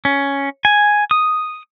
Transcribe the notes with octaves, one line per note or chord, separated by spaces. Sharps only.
C#4
G#5
D#6